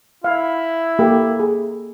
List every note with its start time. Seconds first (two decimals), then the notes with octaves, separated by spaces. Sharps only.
0.24 E4 F5
0.99 A#3 G4 A4
1.40 G#4